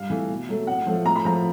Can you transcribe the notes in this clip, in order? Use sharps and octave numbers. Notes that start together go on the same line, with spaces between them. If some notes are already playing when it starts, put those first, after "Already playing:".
Already playing: G2 F5
E3 A3
B2
F#3 A3
A2 F#5
F3 A3
A2 A#5
B5
F3 A3 A#5